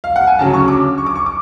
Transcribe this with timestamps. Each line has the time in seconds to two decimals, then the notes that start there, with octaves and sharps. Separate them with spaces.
0.04 F5
0.16 F#5
0.27 G#5
0.39 D2 C#3 F#3 A5
0.54 C#6
0.68 D6
0.98 C#6
1.06 D6
1.16 C#6
1.26 D6